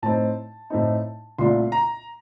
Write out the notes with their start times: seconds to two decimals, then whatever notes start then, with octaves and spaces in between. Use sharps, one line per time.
0.02 A2 A3 C4 D#4 A5
0.70 A2 A3 C4 D#4
1.38 C2 A#2 A3 D4 C6
1.72 A#5